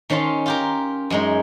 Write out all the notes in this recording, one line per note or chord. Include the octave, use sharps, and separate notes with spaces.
D#3 C#4 F5 A5 C6
F4 G4 A#4
F#2 G#3 D#4